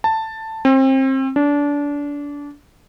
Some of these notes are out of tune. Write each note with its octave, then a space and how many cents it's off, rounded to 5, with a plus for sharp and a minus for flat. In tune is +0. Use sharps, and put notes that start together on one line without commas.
A5 +10
C4 +30
D4 -25